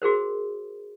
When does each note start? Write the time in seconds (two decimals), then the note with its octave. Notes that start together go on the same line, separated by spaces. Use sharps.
0.02 F#4 G#4 A#4 C5